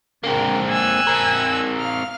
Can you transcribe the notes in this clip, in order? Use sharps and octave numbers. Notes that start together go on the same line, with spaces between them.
C#3 A#3 C4 D4 A#4
G#5 E6 F#6
C4 A#4
F5 F6